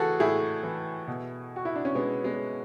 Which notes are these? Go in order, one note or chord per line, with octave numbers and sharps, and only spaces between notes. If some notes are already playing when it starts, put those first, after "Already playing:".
Already playing: A2 E3 F#4 G#4 A4
A2 E4 G#4
E3
B2
F#4
E4
D4
C#4
B2 G#3 B3
G#3 B3